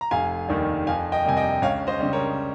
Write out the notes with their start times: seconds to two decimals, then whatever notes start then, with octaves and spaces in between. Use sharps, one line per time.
0.01 A#5
0.11 F1 F5 G#5
0.49 D#2 D#3 G3
0.87 F2 F5 G#5
1.12 D#5 G5
1.25 C3 G3 A#3 G#5
1.37 D#5 G5
1.62 C#2 C#5 F5
1.87 C5 D#5
2.00 C#3 G3
2.13 A#4 C#5